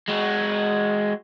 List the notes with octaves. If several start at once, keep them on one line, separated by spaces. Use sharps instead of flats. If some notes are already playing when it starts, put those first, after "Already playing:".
G#3 F#4